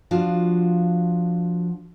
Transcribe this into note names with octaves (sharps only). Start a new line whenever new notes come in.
F3 D4 F4 F#4